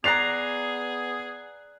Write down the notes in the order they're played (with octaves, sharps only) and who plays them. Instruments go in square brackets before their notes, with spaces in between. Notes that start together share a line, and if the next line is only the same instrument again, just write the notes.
[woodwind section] B3 G#4 [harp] D5 A#5 [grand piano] F#6 C7 F7